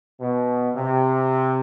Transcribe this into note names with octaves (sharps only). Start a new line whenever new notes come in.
B2
C3